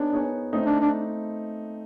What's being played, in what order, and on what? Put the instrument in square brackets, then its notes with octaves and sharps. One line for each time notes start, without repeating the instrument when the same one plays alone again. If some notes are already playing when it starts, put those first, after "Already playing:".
Already playing: [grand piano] B3 D#4 G#4 C#5 [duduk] D4
[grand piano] B3 D#4 G#4 C#5
A3 C4 D#4
[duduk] D4
D4